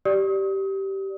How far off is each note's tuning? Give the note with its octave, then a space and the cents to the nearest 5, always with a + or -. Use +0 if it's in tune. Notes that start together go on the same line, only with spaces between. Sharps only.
G4 -15 D5 +0 D#6 +35